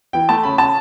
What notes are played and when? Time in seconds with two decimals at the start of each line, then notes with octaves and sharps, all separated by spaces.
0.13 E3 G5
0.29 A3 A5
0.43 C#3 B5
0.58 C#3 A5